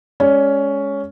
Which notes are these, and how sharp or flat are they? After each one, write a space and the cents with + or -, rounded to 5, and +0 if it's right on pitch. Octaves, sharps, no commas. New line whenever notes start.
G#3 +0 C#4 +10 D5 +0